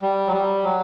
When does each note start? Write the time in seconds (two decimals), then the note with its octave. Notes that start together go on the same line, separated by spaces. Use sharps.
0.02 G3
0.27 F#3
0.32 G3
0.63 F#3